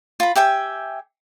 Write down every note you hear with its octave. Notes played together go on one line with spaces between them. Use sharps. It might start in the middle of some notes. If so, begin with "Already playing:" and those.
F4 B5
G4 E5 G5 G#5